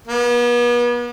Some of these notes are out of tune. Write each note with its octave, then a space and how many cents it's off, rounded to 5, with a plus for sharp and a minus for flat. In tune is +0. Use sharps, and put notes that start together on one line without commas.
B3 -40